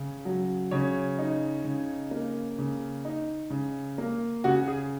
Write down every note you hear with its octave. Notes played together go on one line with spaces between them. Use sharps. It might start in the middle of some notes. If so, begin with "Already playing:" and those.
Already playing: C#3 C#4
F#3
C#3 C#5
D#4
C#3
A#3
C#3
D#4
C#3
A#3
C#3 F#4
G#4